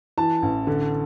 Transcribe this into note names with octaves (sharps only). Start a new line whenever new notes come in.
E3 A5
A1
D3